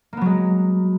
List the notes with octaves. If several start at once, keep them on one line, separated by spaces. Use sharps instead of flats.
F#3 G#3 A#3 B3